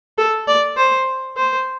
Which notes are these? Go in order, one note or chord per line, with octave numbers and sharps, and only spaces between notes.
A4
D5
C5
C5